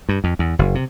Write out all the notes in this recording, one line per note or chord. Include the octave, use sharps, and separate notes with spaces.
G2
F2
E2
F#1
C3